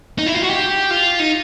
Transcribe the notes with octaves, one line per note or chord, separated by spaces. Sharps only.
D#4
E4
F4
F#4
G4
F4
D#4